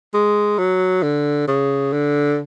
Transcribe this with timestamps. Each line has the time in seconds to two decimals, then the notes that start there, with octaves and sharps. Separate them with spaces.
0.14 G#3
0.58 F#3
1.03 D3
1.48 C#3
1.93 D3